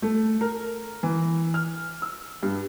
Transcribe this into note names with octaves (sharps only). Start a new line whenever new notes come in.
A3
A#4
E3
F6
E6
G2